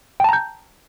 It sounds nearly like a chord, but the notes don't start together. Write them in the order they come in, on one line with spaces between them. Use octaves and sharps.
G5 A5 A#5 G6